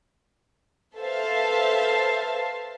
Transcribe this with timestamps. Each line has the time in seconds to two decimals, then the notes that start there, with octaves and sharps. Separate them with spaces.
0.96 A4 B4 C5 E5 F5 A5